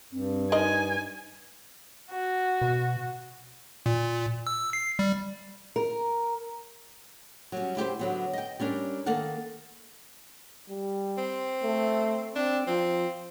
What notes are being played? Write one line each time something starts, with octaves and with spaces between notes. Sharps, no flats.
G2 C4
D#4 A#4 C5 D#5 G#5
F#4
B2
A#2
E6
C7
G3
A#4
F#3 G3 C#4
E4 G4 A#4 C5
D3 F#3 B3
D#5 G5
G3 C#4 D4 A#4
D#3 A#3 A4 F5 F#5
G3
C4
A3
C4 D4
F3 C4